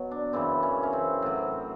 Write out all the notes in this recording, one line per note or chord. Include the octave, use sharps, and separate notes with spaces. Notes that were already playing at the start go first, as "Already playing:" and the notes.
Already playing: B2 F#3
D4
F#2 C#3 E3 C4
C#4
C#4
C4
A2 F#3 C4